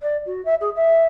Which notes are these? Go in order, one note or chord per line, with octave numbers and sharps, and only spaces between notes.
D5
F#4
E5
G#4
E5